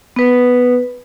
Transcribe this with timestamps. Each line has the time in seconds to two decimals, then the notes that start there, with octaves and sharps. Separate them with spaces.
0.16 B3 B4